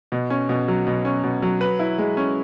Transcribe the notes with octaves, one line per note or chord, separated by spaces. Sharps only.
B2
C#4
B2
F#3
B2
C#4
B2
F#3
B4
E4
G#3
C#4